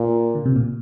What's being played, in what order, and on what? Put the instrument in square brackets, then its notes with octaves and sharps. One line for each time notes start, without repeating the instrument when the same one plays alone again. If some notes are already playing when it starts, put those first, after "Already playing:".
Already playing: [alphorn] A#2
[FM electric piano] D3
C3
A#2